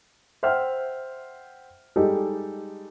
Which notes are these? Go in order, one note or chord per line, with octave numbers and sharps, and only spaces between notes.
C5 E5 F#5 G5 F6
G3 G#3 D#4 G4 A4